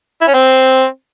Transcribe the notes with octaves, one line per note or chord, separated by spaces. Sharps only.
E4
C#4
C4